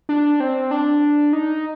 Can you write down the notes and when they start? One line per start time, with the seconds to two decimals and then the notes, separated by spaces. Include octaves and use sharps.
0.09 D4
0.40 C4
0.71 D4
1.33 D#4